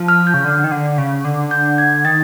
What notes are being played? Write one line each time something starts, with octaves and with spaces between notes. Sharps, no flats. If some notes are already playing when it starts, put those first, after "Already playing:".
Already playing: F3
F6
G6
C#3
D3
D#3
D3
C#3
D3
G6
G#6
D#3 A6